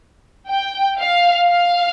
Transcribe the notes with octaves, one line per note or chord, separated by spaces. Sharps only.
G5
F5
F5